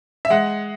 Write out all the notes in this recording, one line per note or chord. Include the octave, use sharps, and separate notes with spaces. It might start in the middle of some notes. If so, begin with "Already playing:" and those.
E5
G#3 F#5